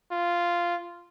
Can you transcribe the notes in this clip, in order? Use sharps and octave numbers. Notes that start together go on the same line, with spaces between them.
F4